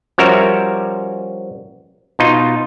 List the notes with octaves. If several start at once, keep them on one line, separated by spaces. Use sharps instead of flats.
F3 G3 C#4 F#4 A#4 E5
B2 D#4 F4